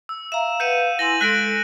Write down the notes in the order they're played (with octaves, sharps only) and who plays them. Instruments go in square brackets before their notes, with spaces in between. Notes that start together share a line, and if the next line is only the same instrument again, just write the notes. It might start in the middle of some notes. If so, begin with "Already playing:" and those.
[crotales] E6
[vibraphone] E5 F5 A#5 [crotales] E7
[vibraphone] B4 F5 F#5 [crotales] G6 C#7 D#7
[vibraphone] E4 G#5 C6 [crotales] A#6 F#7
[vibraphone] G#3 A4 [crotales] F#6 A#6 D7